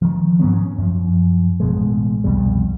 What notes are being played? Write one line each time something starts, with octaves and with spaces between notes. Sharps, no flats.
D#3 F3
G#2 F#3 B3 C#4
C#4
F#2 F3
A1 B2 G#3
C2 F2 B2 G3